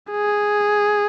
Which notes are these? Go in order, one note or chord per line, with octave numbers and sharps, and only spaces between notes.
G#4